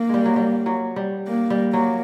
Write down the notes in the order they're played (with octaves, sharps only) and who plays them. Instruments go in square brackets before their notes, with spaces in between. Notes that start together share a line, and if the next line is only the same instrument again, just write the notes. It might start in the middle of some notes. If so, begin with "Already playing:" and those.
Already playing: [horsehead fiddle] A#3
[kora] G3 G#3
F#3
G3
F#3
G3
[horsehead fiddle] A#3
[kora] G3
[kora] F#3 [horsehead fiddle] A#3